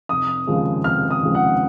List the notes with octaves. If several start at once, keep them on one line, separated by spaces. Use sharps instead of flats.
F1 D#6
D#2 C#3 F3 G#3
F1 F6
D#6
D#2 C#3 F3 G#3
F#5